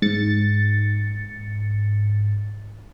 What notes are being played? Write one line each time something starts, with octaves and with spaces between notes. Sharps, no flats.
G#2 A6 C#7